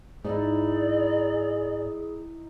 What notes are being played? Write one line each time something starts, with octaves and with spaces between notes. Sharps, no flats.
G#2 D#4 E4 G#4 D5